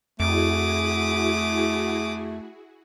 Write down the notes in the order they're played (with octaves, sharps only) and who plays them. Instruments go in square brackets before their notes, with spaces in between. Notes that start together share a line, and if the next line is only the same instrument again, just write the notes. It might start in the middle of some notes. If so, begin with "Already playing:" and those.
[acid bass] F2 [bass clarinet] A3 [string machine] E4 F#4 G#4 [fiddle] D6 D#6